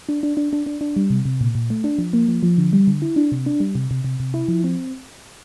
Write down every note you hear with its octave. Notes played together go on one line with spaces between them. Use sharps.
D4
D4
D4
D4
D4
D4
G3
C3
C3
A#2
A#2
A3
D4
F3
A#3
F3
F3
D3
G3
D3
E4
D4
C3
D4
G3
C3
C3
C3
C3
E4
F3
C4